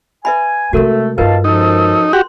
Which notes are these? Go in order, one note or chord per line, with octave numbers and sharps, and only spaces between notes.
B4 E5 G#5 B5
C3 G#3 A3 F#4 A4 A#4
G2 G#3 D#4 F4 A#4 B4 F5 A5
F#2 F3 D#4 A4
F#4 G4 C6